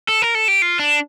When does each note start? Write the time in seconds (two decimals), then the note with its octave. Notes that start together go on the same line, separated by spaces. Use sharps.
0.08 A4
0.22 A#4
0.35 A4
0.48 G4
0.62 F4
0.79 D4